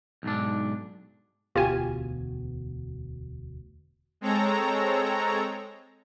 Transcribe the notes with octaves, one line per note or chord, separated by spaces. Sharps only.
B1 G#2 D4
E1 D2 B2 F4 G4 G#5
G#3 C4 A4 C#5 A#5